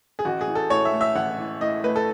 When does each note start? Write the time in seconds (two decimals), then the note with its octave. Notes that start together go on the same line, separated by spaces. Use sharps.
0.19 G#4
0.25 A1 F#4
0.41 G#4
0.47 E3
0.55 A4
0.70 A2 C#5
0.85 E5
0.93 A3
1.01 E5
1.15 A1 F#5
1.38 E3
1.61 A2 D#5
1.84 A3 B4
1.96 A4